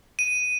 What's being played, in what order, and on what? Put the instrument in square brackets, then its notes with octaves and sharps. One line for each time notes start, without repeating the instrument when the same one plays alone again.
[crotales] D#7